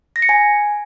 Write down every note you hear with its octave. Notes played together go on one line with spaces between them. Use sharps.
A#6
C#7
G#5